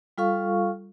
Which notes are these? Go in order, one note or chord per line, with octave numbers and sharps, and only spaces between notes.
G3 F4 A4 F5 C#6